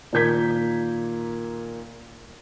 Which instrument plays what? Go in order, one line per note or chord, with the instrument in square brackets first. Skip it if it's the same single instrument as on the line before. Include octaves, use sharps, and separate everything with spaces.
[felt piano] A#2 D#3 A#3 G6 G#6 B6